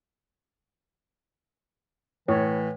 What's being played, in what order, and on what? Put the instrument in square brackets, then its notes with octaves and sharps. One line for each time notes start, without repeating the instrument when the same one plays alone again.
[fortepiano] A2 [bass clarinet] E3 [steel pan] C#5